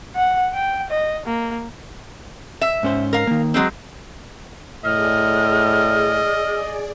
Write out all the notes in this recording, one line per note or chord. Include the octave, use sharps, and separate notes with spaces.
F#5
G5
D#5
A#3
E5
G#2 C#4 C5
A#4 F5
D#3 A#3
F#3 G#3 C4
A2 G#4 D5 D#5 F6